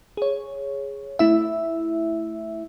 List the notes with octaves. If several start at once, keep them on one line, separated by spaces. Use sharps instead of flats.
G#4 C#5
A3 E4 E5